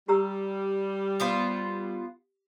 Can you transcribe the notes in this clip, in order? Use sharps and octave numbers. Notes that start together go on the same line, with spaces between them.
G3 G4 A#5 E6
B3 F4 C5